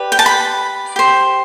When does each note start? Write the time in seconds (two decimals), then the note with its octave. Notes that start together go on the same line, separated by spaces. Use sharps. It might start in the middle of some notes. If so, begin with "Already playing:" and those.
Already playing: G4 B4 D5
0.12 G5
0.19 A5
0.26 B5
0.96 G4 C5